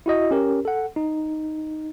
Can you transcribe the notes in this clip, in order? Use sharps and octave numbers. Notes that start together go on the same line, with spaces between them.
E4 F#4 D#5
C#4 G4 A#4
A4 F#5
D#4